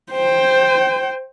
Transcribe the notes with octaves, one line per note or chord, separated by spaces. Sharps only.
C5 G5